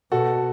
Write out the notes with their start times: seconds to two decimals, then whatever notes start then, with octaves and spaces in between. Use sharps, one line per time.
0.11 B2 F#4 A4